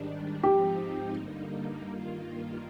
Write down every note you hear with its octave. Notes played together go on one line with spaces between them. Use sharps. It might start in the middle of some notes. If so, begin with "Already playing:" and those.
Already playing: G#2 D#3 G3 D4
G#2 F3 C4 D#4 G4
G2 D3 G3 A#3 D#4
G2 D#3 A#3 F4